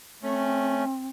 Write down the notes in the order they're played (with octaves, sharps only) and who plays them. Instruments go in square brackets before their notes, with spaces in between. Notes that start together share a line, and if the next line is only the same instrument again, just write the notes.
[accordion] A3 C#4 [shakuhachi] C4